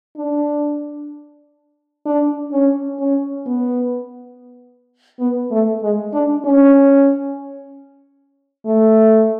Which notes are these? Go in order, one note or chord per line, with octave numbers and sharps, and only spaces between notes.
D4
D4
C#4
C#4
B3
B3
A3
G#3
D4
C#4
A3